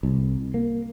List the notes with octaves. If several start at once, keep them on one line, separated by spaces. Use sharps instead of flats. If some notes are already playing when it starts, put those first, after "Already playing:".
C2
A#3